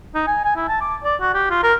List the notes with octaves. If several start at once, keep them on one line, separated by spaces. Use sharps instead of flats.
D#4
G#5
G#5
E4
A5
D6
D5
F#4
G4
F4
A#4